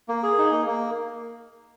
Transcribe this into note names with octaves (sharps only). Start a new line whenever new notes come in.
A#3
G#4
D#4
A#3
A#3